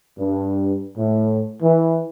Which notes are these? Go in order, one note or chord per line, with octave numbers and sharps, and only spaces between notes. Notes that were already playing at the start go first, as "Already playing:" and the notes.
G2
A2
E3